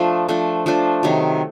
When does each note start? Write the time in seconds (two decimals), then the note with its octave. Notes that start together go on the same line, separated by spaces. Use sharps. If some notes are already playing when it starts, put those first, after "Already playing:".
Already playing: F3 A3 D4
0.28 F3 A3 D4
0.66 F3 A3 D4
1.03 C3 D#3 F#3